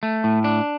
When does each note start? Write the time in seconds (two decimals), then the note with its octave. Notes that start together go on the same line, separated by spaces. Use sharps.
0.03 A3
0.24 A2
0.44 D4